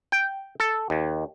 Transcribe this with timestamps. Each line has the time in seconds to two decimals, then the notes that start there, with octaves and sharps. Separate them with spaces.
0.12 G5
0.60 A4
0.90 D#2